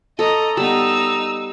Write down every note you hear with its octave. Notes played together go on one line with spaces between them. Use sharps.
A4 C#5 D#5 A#5
G3 B3 D#4 E6